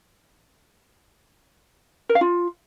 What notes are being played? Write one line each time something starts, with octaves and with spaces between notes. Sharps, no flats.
A#4
F5
F4